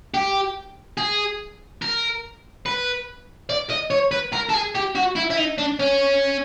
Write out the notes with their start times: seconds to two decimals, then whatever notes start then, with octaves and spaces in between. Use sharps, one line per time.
0.14 G4
0.98 G#4
1.82 A#4
2.66 B4
3.49 D5
3.70 D#5
3.90 C#5
4.11 B4
4.33 A#4
4.49 A4
4.54 G#4
4.75 G4
4.95 F#4
5.16 E4
5.31 E4
5.37 D#4
5.58 D4
5.79 C#4